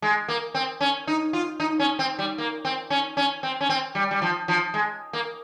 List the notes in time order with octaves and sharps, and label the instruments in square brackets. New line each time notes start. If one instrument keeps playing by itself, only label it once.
[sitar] G#3
A#3
C4
C#4
D#4
F4
D#4
C#4
C4
G3
A#3
C4
C#4
C#4
C4
C#4
C4
G3
G3
F3
F3
G#3
A#3